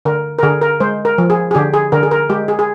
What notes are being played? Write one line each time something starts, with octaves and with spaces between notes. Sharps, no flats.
D3 A#4
A#4
D3 G#4
A#4
G#3 C5
A#4
F3
G#4
G#4
D3 G4
G#4
D3 A#4
G#4
A#4
G#3 G4
G#4
G#4